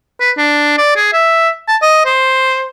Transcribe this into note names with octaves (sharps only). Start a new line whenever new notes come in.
B4
D4
D5
G#4
E5
A5
D#5
C5